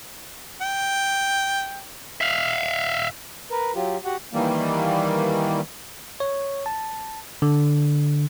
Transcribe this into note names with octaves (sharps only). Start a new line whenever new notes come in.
G5
E5 F5
A#4 B4
F#3 F4 G4
F#4 G4 F#5
D#3 E3 G3 A#3
C#5
A5
D3